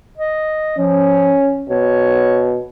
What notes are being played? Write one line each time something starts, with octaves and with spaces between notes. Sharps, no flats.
D#5
F3 C#4
B2 C#5